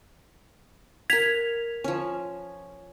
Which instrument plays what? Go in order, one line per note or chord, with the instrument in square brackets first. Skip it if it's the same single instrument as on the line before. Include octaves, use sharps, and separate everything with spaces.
[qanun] A#4 F#5 [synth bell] G#6 B6 F7
[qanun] F3 C#4